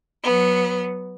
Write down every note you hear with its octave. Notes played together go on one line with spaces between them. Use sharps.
F#3 B3